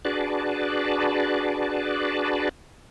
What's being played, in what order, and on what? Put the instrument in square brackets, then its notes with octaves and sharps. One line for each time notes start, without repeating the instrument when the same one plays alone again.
[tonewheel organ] D4 F#4 G#4 B4 D5 A5